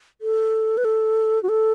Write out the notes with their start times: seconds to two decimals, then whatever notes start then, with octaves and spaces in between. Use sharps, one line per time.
0.21 A4
0.78 B4
0.85 A4
1.43 F#4
1.49 A4